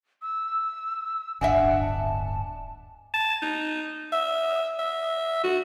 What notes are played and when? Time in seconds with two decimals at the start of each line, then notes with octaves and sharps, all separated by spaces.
0.22 E6
1.41 D1 G1 D4 D#5 E5 F#5 G#5
1.80 A5
3.14 A5
3.42 D#4
4.12 E5
4.79 E5
5.43 F#4